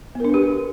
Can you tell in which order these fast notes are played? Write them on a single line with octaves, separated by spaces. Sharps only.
B3 A#4 D4 B4 G4